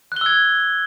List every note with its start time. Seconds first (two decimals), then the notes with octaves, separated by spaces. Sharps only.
0.12 F#6
0.16 G7
0.21 E6
0.26 G#6